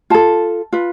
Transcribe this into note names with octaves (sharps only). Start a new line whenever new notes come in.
F4 A4 A5
F4 B4